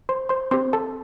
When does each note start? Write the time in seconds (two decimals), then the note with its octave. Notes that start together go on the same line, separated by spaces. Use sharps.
0.09 C5 C6
0.29 C5 C6
0.51 C4 G4 C5 C6
0.73 A4 A5